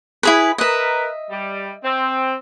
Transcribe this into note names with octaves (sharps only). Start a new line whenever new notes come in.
E4 G#4 B4
A#4 B4 D#5 E5
G3
C4